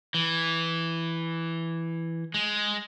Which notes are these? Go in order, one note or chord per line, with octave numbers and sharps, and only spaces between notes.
E3
G#3